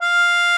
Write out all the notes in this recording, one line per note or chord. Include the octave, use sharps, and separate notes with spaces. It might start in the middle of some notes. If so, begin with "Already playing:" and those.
F5